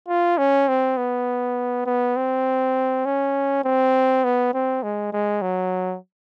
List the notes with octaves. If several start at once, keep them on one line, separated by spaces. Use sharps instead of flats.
F4
C#4
C4
B3
B3
C4
C#4
C4
B3
C4
G#3
G#3
F#3